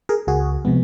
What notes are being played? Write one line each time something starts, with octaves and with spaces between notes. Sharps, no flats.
G#4 A#4
C#2 F#4 G#4
C3 F3 G#3 B3